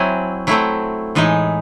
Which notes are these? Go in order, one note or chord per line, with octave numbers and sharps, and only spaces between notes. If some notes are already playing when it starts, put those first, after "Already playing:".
Already playing: F#3 C4 E4 G#5
F#3 A3 C4 E4
A2 E3 G#3 D#4